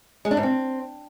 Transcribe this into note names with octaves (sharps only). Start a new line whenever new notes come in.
G#3
D4
G#2
C4